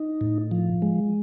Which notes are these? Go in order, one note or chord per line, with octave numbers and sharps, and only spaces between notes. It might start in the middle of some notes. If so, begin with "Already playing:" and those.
Already playing: D#4
A2
F3
G#3